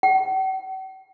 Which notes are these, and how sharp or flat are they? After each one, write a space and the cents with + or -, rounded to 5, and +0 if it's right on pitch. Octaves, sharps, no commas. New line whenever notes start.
F#5 +45